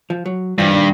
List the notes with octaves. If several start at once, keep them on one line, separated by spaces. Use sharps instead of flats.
F3
F#3
G2 E3 F3
A#2 D#3